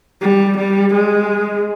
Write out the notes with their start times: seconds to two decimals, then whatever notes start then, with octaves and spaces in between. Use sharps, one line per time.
0.21 G3
0.58 G3
0.94 G#3